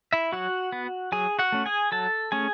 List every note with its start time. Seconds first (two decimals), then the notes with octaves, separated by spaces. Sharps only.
0.13 E4 E5
0.32 F#3 F#4 F#5
0.72 B3
1.12 F#3 G#4 G#5
1.39 F#4 F#5
1.52 A3 C#4
1.66 G#4 G#5
1.92 F#3 A4 A5
2.32 A3 C#4 G#4 G#5